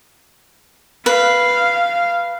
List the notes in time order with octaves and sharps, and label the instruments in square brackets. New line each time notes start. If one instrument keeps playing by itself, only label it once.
[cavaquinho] B4 [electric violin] F5